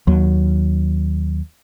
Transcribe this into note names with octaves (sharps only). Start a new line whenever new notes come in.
D#2 F#3